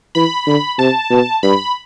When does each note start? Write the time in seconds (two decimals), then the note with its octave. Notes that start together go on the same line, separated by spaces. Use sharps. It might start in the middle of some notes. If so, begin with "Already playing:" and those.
0.15 E3 B5
0.47 D3
0.79 C3 A5
1.10 B2
1.43 G2 B5